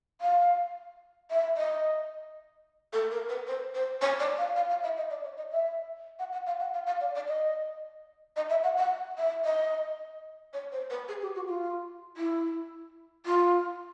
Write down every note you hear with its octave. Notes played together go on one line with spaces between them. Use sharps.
F5
E5
D#5
A4
A#4
B4
C5
C5
C#5
D5
F5
F5
F5
E5
D#5
D5
C#5
D#5
E5
F#5
F#5
F5
F#5
F5
F5
D5
D5
D#5
D#5
E5
F#5
F#5
E5
D#5
C#5
C5
B4
G#4
G4
F#4
F4
E4
F4